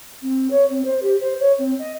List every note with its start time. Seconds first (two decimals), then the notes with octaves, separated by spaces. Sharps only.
0.22 C4
0.50 C#5
0.70 C4
0.84 C5
1.02 G4
1.20 C5
1.39 C#5
1.58 C4
1.79 D#5